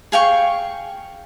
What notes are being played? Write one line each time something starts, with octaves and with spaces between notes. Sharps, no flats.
G#4 F5 G5 C#6